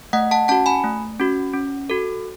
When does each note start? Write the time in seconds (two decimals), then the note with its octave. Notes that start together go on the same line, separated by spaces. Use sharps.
0.13 A3 D#5 F#5
0.31 F#5 A5
0.48 C#4 F#4 F#5 A5
0.66 G#5 B5
0.84 A3
1.20 C#4 F#4
1.54 C#4
1.90 F#4 A4